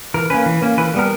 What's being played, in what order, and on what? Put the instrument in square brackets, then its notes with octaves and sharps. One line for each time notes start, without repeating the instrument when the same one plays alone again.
[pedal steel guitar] E3 A#4
A#3 C#4 B4
E3
A#3 C#4
E3 B4
G3 B3 A#4